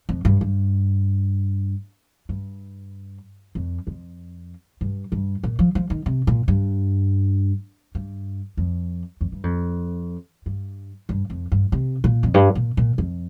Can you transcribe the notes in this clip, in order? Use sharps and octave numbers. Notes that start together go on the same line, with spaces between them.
F2
G2
G2
G2
F2
F2
G2
G2
A#2
F3
F3
D#3
C3
A#2
G2
G2
F2
F2
G2
F2
G2
G2
F2
G2
C3
A#2
F2
G2
A#2
A#2
F2